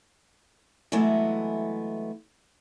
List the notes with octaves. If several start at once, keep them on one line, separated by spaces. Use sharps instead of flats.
E3 F#3 G#3 A3 B3